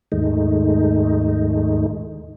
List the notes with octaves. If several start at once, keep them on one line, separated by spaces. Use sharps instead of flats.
D#2 G#2 D#3 G#3 A3 D#4